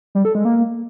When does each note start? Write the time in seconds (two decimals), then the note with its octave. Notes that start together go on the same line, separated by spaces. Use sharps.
0.15 G3
0.25 A4
0.35 G#3
0.45 A#3